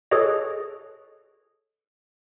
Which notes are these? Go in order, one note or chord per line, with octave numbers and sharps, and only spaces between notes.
G#4 A4 B4 C#5 D#5